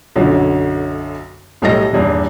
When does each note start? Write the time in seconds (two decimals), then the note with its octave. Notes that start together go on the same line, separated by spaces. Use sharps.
0.16 B1 F#2 D3 F#3
1.62 B1 A2 G3 A4 D#5 A#6
1.93 D#1 E2 G2